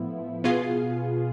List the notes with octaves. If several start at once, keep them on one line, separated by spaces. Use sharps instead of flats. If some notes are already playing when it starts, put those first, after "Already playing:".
Already playing: A2 F3 B3 E4
B2 B3 F4 G#4